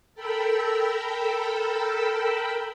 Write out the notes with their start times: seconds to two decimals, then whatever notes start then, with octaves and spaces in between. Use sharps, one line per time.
0.14 A4 A#4 G5 B5 E6